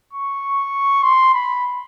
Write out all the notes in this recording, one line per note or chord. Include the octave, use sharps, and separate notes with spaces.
C#6
C6
B5